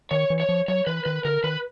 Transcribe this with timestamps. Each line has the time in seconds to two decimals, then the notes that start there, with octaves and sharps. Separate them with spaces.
0.11 D#3 C#5
0.30 E3
0.40 C#5
0.49 F3
0.68 F#3 C#5
0.87 E3 B4
1.05 D#3 B4
1.25 D3 A#4
1.44 D#3 B4